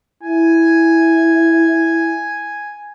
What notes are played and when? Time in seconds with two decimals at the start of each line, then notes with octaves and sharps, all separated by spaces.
0.23 E4 G#5